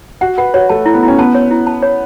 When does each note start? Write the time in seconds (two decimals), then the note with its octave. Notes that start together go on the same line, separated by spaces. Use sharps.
0.21 F#4 F#5
0.38 B4 F#5
0.54 F#4 C#5
0.69 A3 A5
0.86 E4
0.94 B3
1.03 E4
1.08 C#4
1.18 B3 A5
1.35 C#5
1.51 E4
1.67 A5
1.82 C#5